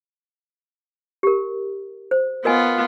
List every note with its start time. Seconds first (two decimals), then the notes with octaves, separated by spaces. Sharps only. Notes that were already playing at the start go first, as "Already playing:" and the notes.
1.23 G4 A#4
2.11 C5
2.45 B3 F4 A#4 D#5 G#5